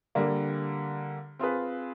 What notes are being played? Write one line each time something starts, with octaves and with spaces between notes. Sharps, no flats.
D3 G3 A#3
C4 F4 G#4 B4